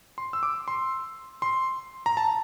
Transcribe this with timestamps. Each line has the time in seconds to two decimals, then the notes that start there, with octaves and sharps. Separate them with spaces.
0.18 C6
0.33 E6
0.43 D6
0.68 C6
1.42 C6
2.06 A#5
2.17 A5